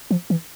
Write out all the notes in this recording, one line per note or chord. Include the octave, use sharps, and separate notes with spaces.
F3
E3